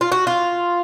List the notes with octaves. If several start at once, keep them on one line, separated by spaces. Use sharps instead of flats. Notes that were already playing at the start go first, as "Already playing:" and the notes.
F4
F#4
F4